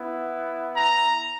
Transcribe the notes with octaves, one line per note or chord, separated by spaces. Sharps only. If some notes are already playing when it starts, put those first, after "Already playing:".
Already playing: B3 E4
A#5